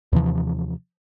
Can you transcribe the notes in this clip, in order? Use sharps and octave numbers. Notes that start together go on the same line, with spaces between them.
D#2 C3 E3 F3